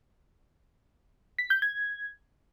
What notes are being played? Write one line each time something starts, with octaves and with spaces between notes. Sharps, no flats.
B6
G6
G#6